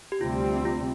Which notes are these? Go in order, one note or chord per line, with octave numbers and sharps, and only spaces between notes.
G4
D2 C3 G3 C4 F4
F4